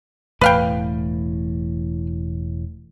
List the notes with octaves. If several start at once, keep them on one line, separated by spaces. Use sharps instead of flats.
E1 A2 E3 B4 F5 G5